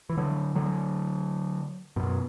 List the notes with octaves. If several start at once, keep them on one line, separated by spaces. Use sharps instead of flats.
E3
D3 F#3
D3 F#3
F#2 B2